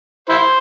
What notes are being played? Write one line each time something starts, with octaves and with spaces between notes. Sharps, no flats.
E4 C5